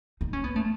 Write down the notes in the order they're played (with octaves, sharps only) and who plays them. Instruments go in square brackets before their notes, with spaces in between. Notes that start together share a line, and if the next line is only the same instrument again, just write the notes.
[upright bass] D#4
C#4
B3
A3